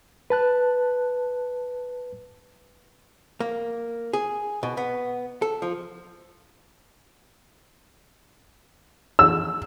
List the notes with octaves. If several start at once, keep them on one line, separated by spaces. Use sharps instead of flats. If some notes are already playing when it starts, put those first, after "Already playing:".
B4 A5 F#6
A#3
G#4
B2
B3
A4
F3
E6